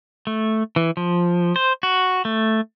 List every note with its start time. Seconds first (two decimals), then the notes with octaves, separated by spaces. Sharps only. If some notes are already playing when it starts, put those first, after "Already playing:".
0.27 A3
0.76 E3
0.97 F3
1.56 C5
1.83 F#4
2.25 A3